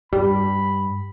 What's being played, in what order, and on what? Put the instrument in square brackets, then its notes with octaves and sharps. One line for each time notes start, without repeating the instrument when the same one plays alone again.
[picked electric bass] G2 [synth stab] G3 [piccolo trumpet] B5